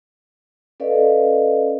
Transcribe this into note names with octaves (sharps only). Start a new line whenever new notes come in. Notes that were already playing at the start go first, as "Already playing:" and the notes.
C#4 A4 B4 D5 D#5 F5